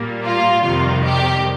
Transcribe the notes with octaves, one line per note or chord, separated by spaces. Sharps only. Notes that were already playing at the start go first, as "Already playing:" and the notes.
Already playing: A#2 G3 A#3
F4
F2 C3 D#3 G3 F4
G4